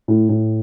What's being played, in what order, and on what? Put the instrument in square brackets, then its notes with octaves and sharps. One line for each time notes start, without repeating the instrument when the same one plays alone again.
[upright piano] A2
A2